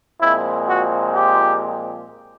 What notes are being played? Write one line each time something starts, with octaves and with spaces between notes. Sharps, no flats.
A#2 F3 G#3 C4 E4
F#4
G4